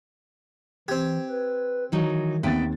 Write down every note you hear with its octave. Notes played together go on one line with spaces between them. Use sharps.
E3 C4 G4 G#6
B4
D#3 E3 F#3 D#4
D#2 B3 C4 E5 G5 A6